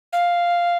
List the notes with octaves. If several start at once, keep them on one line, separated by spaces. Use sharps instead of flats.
F5